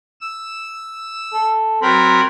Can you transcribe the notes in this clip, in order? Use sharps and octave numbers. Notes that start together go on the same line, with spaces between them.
E6
A4
F#3 C4 A#4 B5